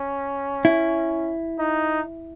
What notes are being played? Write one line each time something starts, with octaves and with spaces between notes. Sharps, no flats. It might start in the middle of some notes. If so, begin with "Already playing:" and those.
Already playing: C#4
E4
D#4